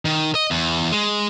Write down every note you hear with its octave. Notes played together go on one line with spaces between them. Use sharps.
D#3
D#5
E2
G#3